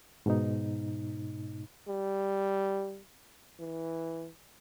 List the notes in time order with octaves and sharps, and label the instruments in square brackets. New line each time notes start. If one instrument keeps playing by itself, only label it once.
[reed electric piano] G#2 B2 D#4
[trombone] G3
E3